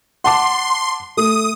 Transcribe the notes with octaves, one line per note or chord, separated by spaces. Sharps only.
F#5 A5 C6 D6
A3 D#6